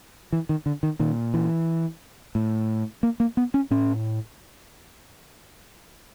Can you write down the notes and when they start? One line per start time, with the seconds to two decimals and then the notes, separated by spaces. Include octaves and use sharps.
0.33 E3
0.49 D#3
0.66 D3
0.83 D#3
0.99 A#2 D#3
1.34 E3
2.35 A2
3.03 A#3
3.20 A#3
3.37 B3
3.54 C#4
3.71 A2 C#4